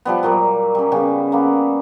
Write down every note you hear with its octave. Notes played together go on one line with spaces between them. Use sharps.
F3 G3 B3
A#2 F#3 G3 A#3
G3 C#4
C#3 G3 B3 C#4
A#3 B3